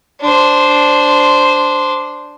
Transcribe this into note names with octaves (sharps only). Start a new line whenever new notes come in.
D4 C5